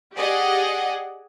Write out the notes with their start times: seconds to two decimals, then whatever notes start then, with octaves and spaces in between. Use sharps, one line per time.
0.16 G4 G#4 D5 D#5 F#5